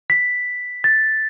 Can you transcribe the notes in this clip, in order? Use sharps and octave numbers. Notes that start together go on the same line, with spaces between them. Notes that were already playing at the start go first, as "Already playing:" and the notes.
B6
A6